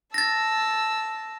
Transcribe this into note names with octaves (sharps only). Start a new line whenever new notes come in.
A5 E6 A6 A#6